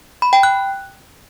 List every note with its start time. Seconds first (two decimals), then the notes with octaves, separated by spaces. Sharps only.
0.22 B5
0.33 G5
0.43 F#6